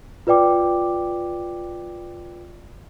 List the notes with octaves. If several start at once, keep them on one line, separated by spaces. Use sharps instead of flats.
F4 B4 D5 G5 D6